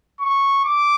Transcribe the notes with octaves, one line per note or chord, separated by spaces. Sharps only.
C#6
D6